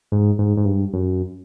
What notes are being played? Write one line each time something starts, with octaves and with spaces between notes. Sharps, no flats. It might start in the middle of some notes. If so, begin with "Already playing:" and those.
G#2
G#2
G#2
G2
F#2